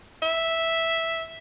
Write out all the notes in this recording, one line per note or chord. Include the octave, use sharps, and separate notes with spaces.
E5